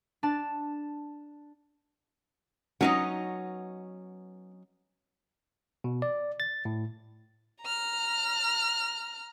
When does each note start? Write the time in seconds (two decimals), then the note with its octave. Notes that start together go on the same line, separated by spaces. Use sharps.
0.23 D4 A5
2.81 F#3 B3 C#4 D#4 D#5 F#5
5.84 B2
6.02 D5
6.40 A6
6.65 A2
7.62 A#5 F6